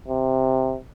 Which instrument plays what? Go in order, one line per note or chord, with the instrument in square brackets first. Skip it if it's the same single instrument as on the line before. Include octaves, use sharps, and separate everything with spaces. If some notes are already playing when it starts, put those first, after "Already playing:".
[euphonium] C3